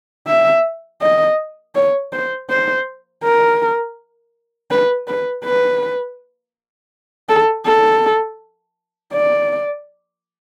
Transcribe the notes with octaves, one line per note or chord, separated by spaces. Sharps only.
E5
D#5
C#5
C5
C5
A#4
B4
B4
B4
A4
A4
D5